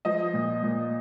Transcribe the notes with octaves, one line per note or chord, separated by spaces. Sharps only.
F3 D#5
A#2
A#2